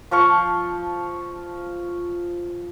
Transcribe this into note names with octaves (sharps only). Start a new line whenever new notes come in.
F3 F5 C#6